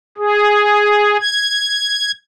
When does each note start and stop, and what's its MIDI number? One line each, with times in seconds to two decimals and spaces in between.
0.18 1.17 68
1.21 2.11 92